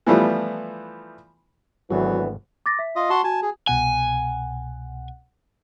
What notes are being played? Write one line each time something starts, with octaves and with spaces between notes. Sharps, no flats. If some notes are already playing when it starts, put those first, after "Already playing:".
E3 F3 G3 A3 B3
G#1 D2 E3 F#3 B3
D6 A6 A#6
E5 B6
F4 D#5
F#4 A5 C6
F#4 G#5 A5
G#4
C2 B2 F#5 G#5